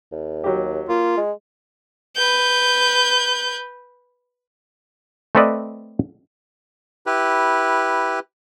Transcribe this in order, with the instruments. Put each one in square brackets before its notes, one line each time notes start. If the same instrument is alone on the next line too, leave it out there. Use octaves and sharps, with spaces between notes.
[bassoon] D#2
[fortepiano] F#3 G4
[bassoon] A#3 [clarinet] F4
[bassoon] G#3
[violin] B4 G6
[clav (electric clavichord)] A3 C4 A4 B4 D5 D#5
[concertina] E4 G4 B4